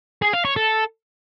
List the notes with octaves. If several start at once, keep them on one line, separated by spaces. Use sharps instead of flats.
G#4
F5
C#5
A4